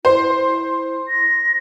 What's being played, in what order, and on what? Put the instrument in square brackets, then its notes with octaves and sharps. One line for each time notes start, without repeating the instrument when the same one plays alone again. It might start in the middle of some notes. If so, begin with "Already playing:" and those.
[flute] E4 [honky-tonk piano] C5
[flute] A#6